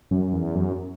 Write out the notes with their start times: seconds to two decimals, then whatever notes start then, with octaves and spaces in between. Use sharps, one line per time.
0.11 F#2
0.33 E2
0.55 F#2